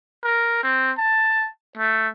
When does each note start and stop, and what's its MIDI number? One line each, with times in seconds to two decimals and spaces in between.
0.24 0.63 70
0.63 0.91 60
0.98 1.49 81
1.78 2.08 57